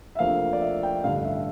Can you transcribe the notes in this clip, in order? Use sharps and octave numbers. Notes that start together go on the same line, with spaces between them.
E5
D2 C3 F3 A#3 F5
D5
E5
G5
A1 G2 D3 F5
E5